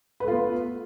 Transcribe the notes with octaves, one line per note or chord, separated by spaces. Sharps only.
A3 B3 F4 B4